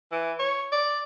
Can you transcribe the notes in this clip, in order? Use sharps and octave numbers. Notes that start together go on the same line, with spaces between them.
E3
C#5
D5